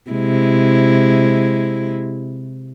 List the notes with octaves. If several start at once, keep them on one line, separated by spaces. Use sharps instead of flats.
C3 G#3 E4